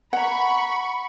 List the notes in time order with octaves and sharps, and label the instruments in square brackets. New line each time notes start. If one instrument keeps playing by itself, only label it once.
[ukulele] F#5 A#5 [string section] B5 C#6